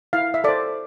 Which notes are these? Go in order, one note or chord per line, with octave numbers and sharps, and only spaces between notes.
E4 F5
E5
A4 C5 D5